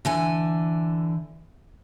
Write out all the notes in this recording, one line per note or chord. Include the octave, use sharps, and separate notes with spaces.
D3 E3 G#5